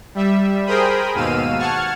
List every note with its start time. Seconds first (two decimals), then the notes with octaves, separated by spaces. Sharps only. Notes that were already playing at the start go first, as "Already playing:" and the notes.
0.15 G3 E5
0.66 G#4 A#4 C5 G5 B5 D#6
1.14 D#2 G#2 B2 F5 E6 D#7
1.59 F#5 A5 C#6 F6 G#6